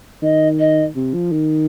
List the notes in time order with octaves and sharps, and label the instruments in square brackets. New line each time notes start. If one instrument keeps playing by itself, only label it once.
[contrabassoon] D#3 [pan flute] D#5
[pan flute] D#5
[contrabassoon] C3
F3
D#3